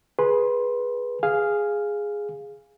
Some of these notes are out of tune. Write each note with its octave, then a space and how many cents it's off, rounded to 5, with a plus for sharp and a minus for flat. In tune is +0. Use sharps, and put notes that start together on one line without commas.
G#4 +0 B4 -15 C6 +10
G#4 -5 F5 +0